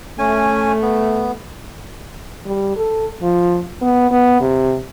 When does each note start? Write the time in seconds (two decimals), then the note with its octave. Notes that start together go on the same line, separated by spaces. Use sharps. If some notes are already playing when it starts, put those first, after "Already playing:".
0.19 A3 C#4 G#5
0.82 B3
2.45 G3
2.76 A4
3.22 F3
3.82 B3
4.11 B3
4.40 C3